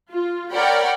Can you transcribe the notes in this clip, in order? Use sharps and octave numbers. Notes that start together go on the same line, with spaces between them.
F4
A#4 C#5 D5 F#5 G5 B5